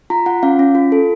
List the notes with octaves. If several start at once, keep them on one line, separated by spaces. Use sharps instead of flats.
F4 A#5
F4 F#5
C#4 F5
C#4
F4
A4